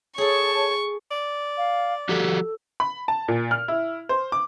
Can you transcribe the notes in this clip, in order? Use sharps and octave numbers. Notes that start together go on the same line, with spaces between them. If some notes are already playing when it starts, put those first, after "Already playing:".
G#4 A4 C#5 A5 C#6
D5
F5
F3 F#4 G4 A4
B5
A5
A#2
F6
E4
C5
D6